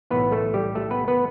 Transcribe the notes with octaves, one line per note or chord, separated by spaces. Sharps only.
B1 A2 E3 B3 B4
A3 A4
G3 G4
A3 A4
B3 B4
B3 B4